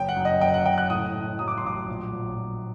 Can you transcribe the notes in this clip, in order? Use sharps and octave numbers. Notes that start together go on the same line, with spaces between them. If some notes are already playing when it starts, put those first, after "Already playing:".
Already playing: F#1 G5
F#5
F#2
D#5
F#1 G5
F#5
F#1 G5
F#6
A2 D#6
A2
F#3 D#6
D6
C6
A1 D6
A#1
A#1
A#1